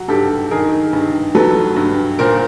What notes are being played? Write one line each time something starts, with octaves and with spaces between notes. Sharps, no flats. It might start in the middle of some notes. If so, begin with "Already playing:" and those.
Already playing: F#3 F#4
G2 G4 A4
D#3 G#4 A#4
G2
F#3 A4 B4
G2
A#2 A#4 C5